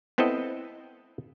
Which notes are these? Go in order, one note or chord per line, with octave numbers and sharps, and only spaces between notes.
B3 C4 E4 A4 D#5